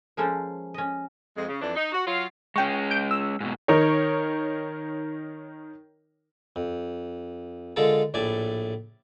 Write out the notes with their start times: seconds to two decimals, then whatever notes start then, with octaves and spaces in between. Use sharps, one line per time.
0.17 F3 G#3 A#3 C#4 A4 C5
0.74 C#4 D#5
1.36 F2 G#3
1.48 C#3
1.61 F2 E3 D4
1.75 D#4
1.92 F#4
2.05 F#3 F4
2.56 G#3 C#4 G5 C#6
2.91 G6 D7
3.11 E6
3.40 G#2 B2
3.68 D#3 D#4 A#4 C#5
6.56 F2
7.76 D3 G#3 F4 A4 A#4 A5
8.14 A#1 A2 D5 G#5 A5